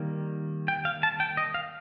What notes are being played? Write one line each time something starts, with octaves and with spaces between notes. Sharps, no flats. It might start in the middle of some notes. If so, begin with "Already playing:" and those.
Already playing: D#3 G3 A#3
G5
F5
A5
G5
D#5
F5